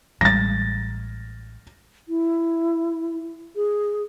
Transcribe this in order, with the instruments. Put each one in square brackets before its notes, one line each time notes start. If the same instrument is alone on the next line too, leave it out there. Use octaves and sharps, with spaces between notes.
[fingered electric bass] A1 G3 G#3 [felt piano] A6 A#6
[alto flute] E4
G#4